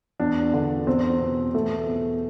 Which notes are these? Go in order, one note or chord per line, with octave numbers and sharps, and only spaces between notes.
E2 D4
D3
E2 C4
B2
E2 A3
B2